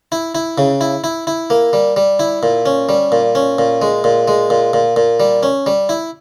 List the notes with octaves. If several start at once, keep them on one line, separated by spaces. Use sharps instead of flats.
E4
E4
C#3
E4
E4
E4
A#3
G3
G3
E4
A#2
C#4
G3
A#2
C#4
A#2
G#3
A#2
G#3
A#2
A#2
A#2
G3
C#4
G3
E4